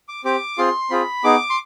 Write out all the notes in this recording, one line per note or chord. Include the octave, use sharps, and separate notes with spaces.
D6
C4 G4 D6
C4 F4 G#4 C6
C4 F4 G#4 B5
B3 D#4 G#4 D6
C6